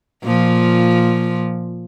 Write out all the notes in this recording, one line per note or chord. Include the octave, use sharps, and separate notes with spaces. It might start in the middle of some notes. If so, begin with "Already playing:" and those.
A#2 F3